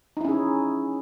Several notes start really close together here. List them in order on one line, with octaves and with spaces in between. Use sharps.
D#4 E4 C#4 G#4